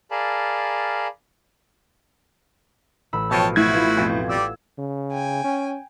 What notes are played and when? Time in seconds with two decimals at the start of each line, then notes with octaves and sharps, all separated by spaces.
0.11 G#4 A#4 D5 F5 A5 B5
3.13 A1 B5 E6
3.31 B2 F3 C#5 G5 A5
3.56 A2 E4 F#4 G#6
3.73 B3 F4
3.97 F2 B2
4.29 G3 D5 E6
4.79 C#3
5.11 G5 G#5
5.44 C#4